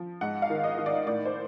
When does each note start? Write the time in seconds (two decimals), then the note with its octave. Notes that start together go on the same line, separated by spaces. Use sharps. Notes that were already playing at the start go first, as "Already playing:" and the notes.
Already playing: F3
0.21 G#2 F#5
0.42 F5
0.50 D#3
0.64 D#5
0.78 D#3
0.86 D5
1.07 A2 D5
1.25 C5